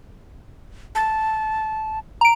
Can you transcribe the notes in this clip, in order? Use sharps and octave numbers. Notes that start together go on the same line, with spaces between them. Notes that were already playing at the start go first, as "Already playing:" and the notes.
A5
A#5 D7